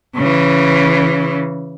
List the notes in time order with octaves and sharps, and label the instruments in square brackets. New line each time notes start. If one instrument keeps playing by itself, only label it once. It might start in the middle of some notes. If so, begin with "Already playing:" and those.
[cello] C#3 E3